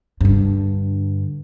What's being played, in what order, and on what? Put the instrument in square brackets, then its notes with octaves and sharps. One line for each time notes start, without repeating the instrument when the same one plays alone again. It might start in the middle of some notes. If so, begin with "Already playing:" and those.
[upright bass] G2 D3